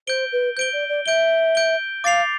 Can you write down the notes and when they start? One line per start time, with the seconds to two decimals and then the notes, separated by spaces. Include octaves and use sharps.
0.07 C5 G6 D7 G7
0.32 B4
0.57 C5 G6 D7 G7
0.73 D5
0.89 D5
1.06 E5 G6 D7 G7
1.55 G6 D7 G7
2.04 F5 D6 A6 C7 F7